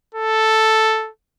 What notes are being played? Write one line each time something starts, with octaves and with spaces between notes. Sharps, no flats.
A4